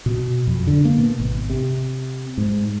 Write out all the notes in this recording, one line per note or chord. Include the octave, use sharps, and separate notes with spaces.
B2
F2
D3
A#3
B2
G#1
C3
G#2